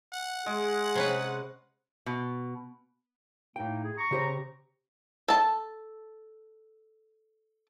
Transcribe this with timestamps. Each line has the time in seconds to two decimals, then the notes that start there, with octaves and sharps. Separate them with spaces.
0.14 F#5
0.46 G#3 G#4
0.95 C3 C#4 B4
2.06 B2
3.56 A2 A#3 D#4 G5
3.83 G#4
3.98 A#5 C#6
4.11 C#3 G4 C5
5.28 A4 A5